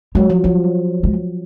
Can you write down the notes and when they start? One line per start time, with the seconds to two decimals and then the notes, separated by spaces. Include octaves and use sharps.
0.15 F#3 G#3
0.30 F3
0.44 F3 G3
1.03 G#3